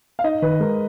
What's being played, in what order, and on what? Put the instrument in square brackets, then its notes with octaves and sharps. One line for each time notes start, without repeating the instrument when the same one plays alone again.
[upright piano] F5
[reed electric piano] D#4 [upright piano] D#5
[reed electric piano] D#3 [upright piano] B4
[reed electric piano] G#3 [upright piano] A#4